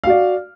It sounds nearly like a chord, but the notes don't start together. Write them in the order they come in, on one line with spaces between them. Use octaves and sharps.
F5 F#4 D5